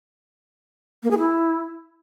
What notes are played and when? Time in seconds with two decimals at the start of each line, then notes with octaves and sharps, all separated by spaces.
1.03 A#3
1.11 G#4
1.18 E4